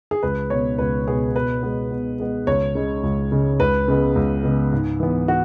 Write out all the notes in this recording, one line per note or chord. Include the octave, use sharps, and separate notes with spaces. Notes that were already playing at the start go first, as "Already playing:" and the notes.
G#4
C#2 B4
B2 B3 C#5
C#2 B4
B2 B3 G#4
B2 B4
G#3 B3
B2
G#3 B3
C#2 C#5
C#3 G#3
C#2
C#3 G#3
C#2 B4
C#3 G#3 B3
C#2
C#3 G#3 B3
G#2
E3 B3
F#4